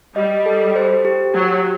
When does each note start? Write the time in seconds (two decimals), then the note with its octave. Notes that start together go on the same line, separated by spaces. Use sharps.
0.16 G3 D#5
0.46 A4
0.76 C5
1.05 G4
1.34 F#3 G4